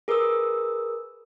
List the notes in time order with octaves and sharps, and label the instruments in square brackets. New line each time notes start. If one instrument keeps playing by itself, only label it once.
[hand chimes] G#4 A#4 B4 D#6 E6